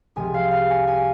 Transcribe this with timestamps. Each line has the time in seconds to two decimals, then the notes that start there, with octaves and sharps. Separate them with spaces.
0.16 C2 C3 F3 G#3 G#5
0.34 F5
0.51 F5
0.70 G#5
0.87 G#5